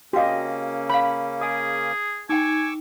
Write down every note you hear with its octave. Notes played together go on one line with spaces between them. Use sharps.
C#3 A#3 C#4 F#4 G4 D#5 F5
C#5 F5 B5
G#4 D#5 G#5 D#6
D#4 G5 G#5 C#6 D6 E6